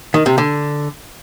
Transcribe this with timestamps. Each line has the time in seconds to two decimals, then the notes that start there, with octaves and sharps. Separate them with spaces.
0.14 D#3
0.26 C3
0.38 D3